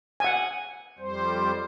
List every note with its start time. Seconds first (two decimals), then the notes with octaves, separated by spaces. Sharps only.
0.20 F#5 G#5
0.99 F2 G3 C5